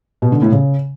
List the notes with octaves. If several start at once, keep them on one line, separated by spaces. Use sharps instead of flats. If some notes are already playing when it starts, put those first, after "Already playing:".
B2
D3
A2
C#3